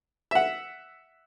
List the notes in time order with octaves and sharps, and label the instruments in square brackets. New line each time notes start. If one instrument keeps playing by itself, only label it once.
[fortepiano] E5 F#5